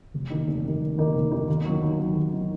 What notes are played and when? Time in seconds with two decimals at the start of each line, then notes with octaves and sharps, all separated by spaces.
0.14 F1
0.30 D#2 D#3 A#3 D#4
0.47 F1
0.64 D#2 D#3 A#3 D#4
0.81 F1
0.98 D#2 D#3 A#3 D#4
1.15 F1
1.31 D#2 D#3 A#3 D#4
1.48 D#2
1.65 D#3 F#3
1.82 D#2
1.99 D#3 F#3
2.15 D#2
2.33 D#3 F#3